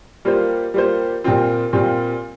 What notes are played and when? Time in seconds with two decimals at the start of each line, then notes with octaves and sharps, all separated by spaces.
0.25 G3 A#3 F4 C5
0.74 G3 A#3 F4 C5
1.24 A#2 G3 C4 F4
1.73 A#2 G3 C4 F4